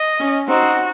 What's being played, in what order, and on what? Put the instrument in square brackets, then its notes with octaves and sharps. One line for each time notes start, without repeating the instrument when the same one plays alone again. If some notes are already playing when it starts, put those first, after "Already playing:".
Already playing: [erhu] D#5
[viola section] C#4
[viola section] C4 D#4 [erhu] F#4